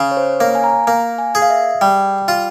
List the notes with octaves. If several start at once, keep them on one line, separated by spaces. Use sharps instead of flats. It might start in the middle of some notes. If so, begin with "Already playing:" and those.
Already playing: C#3
C#5
C5
A#3 C#5
G#5
A#5
A#3
G#5
G#4
F5
E5
G3 G5
F4